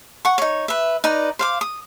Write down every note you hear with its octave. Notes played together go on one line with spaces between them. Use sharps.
F#5 C#6
D#4 C#5
B4 E5
D#4 B4 D5 A#5
C5 F5 D6
D#6